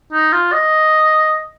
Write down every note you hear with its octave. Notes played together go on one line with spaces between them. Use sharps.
D#4
F4
D#5